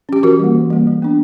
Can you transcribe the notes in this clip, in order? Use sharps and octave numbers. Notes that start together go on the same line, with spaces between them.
C#4 G4
E3 F#4 A#4
G3 A#3
E3
G3 A#3
G3
B3 D4